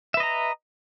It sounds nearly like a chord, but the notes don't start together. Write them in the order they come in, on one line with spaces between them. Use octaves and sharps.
E5 B4 D#5 A#5